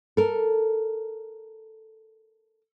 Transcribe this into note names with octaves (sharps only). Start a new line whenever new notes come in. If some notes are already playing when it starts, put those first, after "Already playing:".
A4 A#4